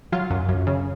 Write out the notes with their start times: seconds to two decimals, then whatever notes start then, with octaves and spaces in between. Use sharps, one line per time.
0.12 F#3 F4
0.31 F#2
0.49 F#2
0.67 C#3